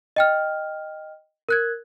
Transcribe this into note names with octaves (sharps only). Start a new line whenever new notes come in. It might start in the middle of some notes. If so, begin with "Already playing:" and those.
D#5 G5 F6
A#4 F#6 G#6